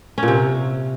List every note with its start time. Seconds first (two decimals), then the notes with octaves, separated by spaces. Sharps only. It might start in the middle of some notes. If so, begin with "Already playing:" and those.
0.18 C#4
0.23 A#2
0.28 C3